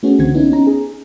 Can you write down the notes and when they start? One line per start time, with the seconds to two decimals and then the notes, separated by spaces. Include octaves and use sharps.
0.03 A3 B3 C#4 F#4 G#4
0.19 C2 D3 E3 C4 F#4 G#6
0.34 B3 C#4 D#4 E4
0.52 C#4 D#4 A#5
0.67 G#4